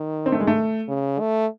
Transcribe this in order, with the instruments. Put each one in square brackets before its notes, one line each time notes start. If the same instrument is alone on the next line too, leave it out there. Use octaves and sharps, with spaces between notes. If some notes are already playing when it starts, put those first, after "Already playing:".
Already playing: [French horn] D#3
[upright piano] C4
A3
G#3
A3
[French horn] C#3
A3